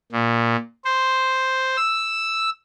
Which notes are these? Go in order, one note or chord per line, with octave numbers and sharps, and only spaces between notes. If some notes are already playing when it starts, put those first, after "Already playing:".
A#2
C5
E6